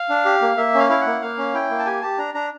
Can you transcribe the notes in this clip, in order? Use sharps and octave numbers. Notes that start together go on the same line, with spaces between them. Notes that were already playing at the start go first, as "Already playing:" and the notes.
Already playing: F5
D4
G4
A#3
A#3 E5
C#4 F5
E4 F5
F#5
A#3
A#3 F5
C#4
E4 G5
A#3
A5
G4 G#5
G4 A5
D4 A#5
D4 A#5